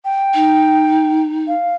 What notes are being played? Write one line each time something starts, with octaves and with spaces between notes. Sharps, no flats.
G5
D#4
F5